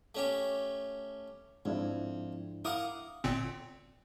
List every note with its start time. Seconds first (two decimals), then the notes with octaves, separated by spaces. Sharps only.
0.15 A3 C#4 G4
1.65 F2 G#2 D4 E4
2.65 E4 A#4 F5 F#5 D6 D#6
3.24 G1 A#2 C4